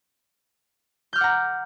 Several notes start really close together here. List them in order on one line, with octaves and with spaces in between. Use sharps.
G6 F6 D6 F#5 A#5